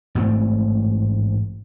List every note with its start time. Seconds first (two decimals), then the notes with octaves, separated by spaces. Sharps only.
0.15 A1 G#2 A3 C4